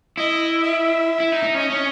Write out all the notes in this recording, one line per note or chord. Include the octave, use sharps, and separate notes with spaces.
E4 D#5
E5
E4
D#4
D#4
C#4 D#5
C#4